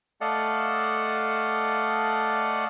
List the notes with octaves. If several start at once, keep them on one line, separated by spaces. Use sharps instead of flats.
A3 A4 D5 D#5 F5 F#5